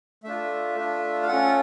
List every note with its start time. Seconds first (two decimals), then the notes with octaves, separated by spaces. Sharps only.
0.24 A3 D4 F4 E5
0.75 A3 D4 F4
1.23 F5
1.27 C#4 F4 A4 F#5